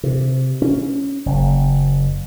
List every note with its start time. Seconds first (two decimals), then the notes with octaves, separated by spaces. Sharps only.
0.03 C3
0.62 C#4
1.26 F#1